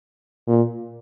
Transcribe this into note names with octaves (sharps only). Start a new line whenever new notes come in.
A#2